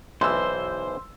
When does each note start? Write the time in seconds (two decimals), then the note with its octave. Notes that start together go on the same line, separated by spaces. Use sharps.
0.21 B1 E3 C5 C6 E6